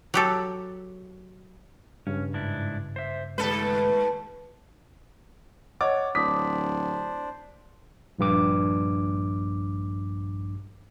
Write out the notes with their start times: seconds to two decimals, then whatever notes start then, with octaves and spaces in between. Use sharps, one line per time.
0.14 F#3 G4 A4
2.07 G2 C#3 C#4
2.34 G#2 D4 E4
2.96 C5 E5
3.38 D#2 G#3 A3 A4 B4
5.81 C#5 D#5 F#5 D6 A6
6.15 D1 D4 C5 D5 D6 D#6 B6
8.19 A#1 G2 D6